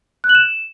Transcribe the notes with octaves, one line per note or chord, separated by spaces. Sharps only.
F#6
F#7
E7